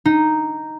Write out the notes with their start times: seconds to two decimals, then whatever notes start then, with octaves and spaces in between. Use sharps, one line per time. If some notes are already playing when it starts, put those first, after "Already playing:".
0.05 D#4